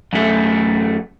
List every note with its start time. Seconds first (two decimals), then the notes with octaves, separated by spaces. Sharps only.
0.13 F#2 A3